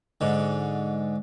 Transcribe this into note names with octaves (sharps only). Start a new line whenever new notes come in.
G#2 D3